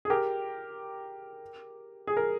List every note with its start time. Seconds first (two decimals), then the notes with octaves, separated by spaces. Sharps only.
0.05 G#4
0.10 G4 A#4
2.07 G#4
2.17 A#4